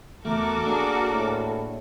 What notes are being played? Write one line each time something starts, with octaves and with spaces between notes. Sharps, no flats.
E2 A3 F#4 A4 A#4 D6
A#3 D4 G#4
A2